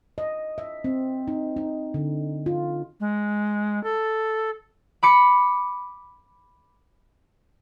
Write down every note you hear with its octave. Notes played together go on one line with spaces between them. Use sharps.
D#5
E5
C4
D#4
D#4
D3
F4
G#3
A4
B5 D6 C#7